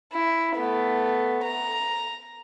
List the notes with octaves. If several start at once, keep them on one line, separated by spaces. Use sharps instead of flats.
E4
A3 B3
A#5